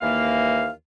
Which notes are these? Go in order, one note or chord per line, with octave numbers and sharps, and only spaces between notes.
D#2 E3 A#3 F5